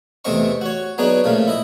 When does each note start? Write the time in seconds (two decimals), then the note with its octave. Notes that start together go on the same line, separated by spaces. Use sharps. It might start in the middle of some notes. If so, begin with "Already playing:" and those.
0.25 E2 C3 A3 C4 D#5 C#6
0.61 F#4 C#5
0.98 F#3 B3 D4 D#4 F#4 G#4
1.24 A#2 C#3 F3 A3
1.48 E4 D#5